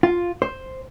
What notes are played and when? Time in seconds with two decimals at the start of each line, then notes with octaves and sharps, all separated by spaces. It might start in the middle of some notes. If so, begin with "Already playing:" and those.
0.03 F4
0.42 C5